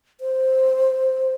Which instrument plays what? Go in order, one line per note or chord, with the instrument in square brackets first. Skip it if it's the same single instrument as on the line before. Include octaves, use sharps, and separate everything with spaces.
[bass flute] C5